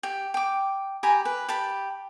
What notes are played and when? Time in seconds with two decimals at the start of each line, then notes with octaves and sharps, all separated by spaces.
0.03 G4
0.34 G5 D6
1.03 G4 G#5 A#5 B5
1.25 B4
1.48 G4 A5 B5